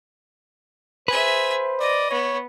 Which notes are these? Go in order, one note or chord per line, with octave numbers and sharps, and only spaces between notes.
G#4 B4 C5 E5
D5 D#5
B3 C#5